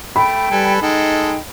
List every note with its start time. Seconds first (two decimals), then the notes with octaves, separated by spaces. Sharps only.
0.16 A3 G5 B5
0.51 G3 A4 B4 G#5
0.82 G#3 D#4 A4 G5